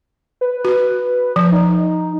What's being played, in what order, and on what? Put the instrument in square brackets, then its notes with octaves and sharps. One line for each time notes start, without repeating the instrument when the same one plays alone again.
[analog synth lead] B4
[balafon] F#4
F3
[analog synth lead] D#4